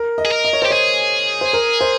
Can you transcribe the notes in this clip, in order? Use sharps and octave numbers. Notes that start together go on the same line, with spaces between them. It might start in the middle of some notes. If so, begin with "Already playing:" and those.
Already playing: A#4
D#5
G#4
A#4
D#5
C#5
G4 C5
G#4 C#5
C5
A#4
C5